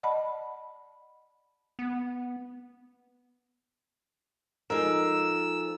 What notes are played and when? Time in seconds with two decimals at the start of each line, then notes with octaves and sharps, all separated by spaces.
0.03 D5 D#5 F#5 A5 B5
1.79 B3
4.70 F3 G#3 D#4 A4 A#4 E6